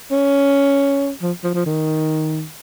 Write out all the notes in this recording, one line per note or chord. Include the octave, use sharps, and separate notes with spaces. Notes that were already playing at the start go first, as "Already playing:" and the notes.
C#4
F3
F3
F3
D#3